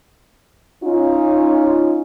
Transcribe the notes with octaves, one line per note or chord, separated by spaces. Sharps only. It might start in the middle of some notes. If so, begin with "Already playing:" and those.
C#4 D#4 F4